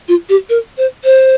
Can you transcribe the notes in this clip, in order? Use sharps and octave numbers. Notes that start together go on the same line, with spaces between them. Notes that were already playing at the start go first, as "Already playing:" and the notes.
F4
G4
A#4
C5
C5